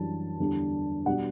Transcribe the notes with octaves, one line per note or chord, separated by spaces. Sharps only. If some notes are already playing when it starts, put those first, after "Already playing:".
Already playing: F#2 E3 G3 D4 A5
E2 D3 G3 D4
B2 G3 D4 F#5